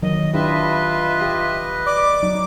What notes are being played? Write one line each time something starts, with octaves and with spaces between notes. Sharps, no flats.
D#3 F#3 D#5
D4 E4 F4 G4 B4 D#5 E5
G4
D5 D6
F#3 D#4